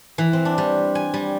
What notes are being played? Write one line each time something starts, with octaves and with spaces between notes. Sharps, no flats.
E3
C4
D4
G3
G#5
G3